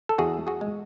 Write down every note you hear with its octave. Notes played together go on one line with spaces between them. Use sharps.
A4
E2 F#4 G#4
F#4 G#4
G#3